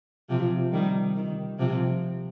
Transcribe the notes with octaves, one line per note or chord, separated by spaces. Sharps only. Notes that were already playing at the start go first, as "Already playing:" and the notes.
C3 F3
D#3 G3
D#3
C3 F3